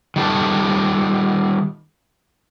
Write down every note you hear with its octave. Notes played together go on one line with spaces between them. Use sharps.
D#3 G3 A4